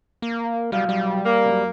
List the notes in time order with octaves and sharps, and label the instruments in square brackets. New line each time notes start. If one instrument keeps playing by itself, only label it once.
[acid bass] A#3
[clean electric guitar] B1 F#3 F5 [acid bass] G3
[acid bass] G3
[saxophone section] A#3
[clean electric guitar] C2 F#2